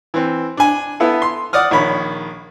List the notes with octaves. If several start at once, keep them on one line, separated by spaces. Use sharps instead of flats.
E3 C4
D4 G#5
B3 E4 A4
C6
D5 F#5 D#6 F6
A#1 D#3 C#5 B5